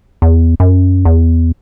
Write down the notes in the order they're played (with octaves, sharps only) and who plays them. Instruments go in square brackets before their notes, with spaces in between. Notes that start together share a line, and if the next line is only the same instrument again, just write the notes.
[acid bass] E2
F#2
E2